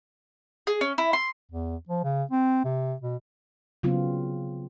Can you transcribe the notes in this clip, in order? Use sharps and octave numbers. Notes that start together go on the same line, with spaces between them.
G#4
C#4
E4
C6
E2
F3
C#3
C4
C3
B2
C#3 F#3 B3 C4 F4